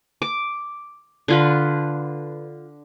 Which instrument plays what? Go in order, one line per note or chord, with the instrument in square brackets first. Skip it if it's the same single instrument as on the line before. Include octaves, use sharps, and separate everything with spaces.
[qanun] D6
D3 F4 B4